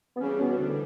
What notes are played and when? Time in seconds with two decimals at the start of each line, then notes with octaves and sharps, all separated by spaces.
0.16 B3
0.20 C#3 E3 G3 C#4 D4
0.39 B2 B3
0.57 D2 D3